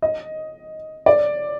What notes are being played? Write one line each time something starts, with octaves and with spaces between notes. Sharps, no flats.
D#5
D5